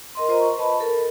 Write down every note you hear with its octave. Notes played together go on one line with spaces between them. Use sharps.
A#4 D#5 C6
F4 A#4 C5 D#5 A#5
C#6
B4 D#5 A5 B5
A4 A#4